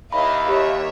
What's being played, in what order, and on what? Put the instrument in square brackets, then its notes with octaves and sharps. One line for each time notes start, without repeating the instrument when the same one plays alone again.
[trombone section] D#2 [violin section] E4 D#5 F5 [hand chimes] B5
[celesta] G4 D#5 [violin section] C#5 E5